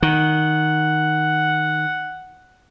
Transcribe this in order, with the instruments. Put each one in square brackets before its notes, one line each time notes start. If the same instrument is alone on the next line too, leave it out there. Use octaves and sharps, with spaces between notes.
[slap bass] D#3 [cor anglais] F#5